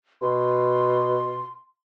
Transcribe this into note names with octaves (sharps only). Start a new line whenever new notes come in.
B2 C6